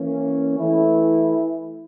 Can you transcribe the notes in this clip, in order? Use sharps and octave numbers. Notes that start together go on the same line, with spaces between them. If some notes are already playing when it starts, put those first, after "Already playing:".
Already playing: E3 A#3 C#4
E3 A3 E4